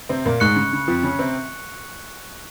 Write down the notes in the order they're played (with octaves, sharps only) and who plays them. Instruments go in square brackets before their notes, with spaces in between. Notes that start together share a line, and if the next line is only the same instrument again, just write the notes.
[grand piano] C3 C4
A#2 A#3
[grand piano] G#2 G#3 [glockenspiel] C#6 F#6 C#7
[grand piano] C#3
C#3
F2 F3
C#3 C#4
C3 C4